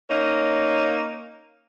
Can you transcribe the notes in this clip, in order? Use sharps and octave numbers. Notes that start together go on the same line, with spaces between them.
A#3 C#4 D#4